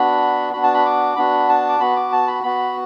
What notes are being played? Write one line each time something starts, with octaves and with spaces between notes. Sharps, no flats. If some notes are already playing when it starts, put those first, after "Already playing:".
Already playing: B3 D4 F#4 B5
B3 D4 F#4 B5
A5
B5
D6
B3 D4 F#4 B5
A5
D6
B3 F#4 B5
D6
A5
B5
B3 F#4 B5